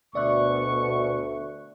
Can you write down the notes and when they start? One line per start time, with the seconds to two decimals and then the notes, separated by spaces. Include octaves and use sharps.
0.15 D2 B2 D5 E5 C#6 F#6